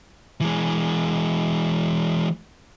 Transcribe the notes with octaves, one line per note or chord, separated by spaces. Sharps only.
E3 G#3